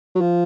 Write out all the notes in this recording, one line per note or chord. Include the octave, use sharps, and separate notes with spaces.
F#3
F3